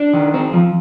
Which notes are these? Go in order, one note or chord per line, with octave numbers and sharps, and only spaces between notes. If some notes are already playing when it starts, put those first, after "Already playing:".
Already playing: D4
D#3
C4
F3